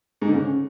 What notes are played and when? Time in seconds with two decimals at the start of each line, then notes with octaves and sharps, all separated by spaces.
0.22 G#2
0.28 D3
0.34 C#3